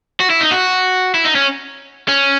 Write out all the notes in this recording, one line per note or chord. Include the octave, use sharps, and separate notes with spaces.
F#4
E4
D#4
F#4
E4
D#4
C#4
C#4